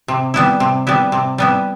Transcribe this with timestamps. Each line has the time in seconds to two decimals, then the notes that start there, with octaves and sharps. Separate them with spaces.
0.08 C3
0.34 G3 B3 E4
0.60 C3
0.87 G3 B3 E4
1.12 C3
1.38 G3 B3 E4